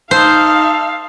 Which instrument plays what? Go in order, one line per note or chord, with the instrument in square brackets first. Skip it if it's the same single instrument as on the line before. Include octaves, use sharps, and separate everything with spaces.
[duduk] D#4 [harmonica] A4 [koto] C5 [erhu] F5